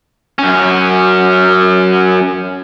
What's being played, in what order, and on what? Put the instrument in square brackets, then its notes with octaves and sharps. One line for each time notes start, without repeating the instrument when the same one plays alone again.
[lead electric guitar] F#2 C#4